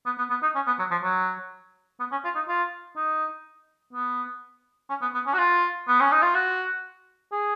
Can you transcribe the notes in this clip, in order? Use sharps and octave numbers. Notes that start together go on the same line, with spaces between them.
B3
B3
B3
D#4
C#4
B3
F#3
F3
F#3
B3
C#4
F4
D#4
F4
D#4
B3
C#4
B3
B3
C#4
F#4
F4
B3
C#4
D#4
F4
F#4
G#4